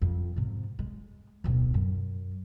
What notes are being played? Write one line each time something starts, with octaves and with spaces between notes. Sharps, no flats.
F2
G#2 C3
G#3
D1 B1
F#2